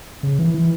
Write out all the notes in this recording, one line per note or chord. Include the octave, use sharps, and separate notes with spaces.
C#3
E3
E3